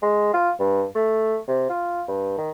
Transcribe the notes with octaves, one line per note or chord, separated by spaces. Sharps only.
G#3
F4
G2
A3
C3
F4
G2
D#3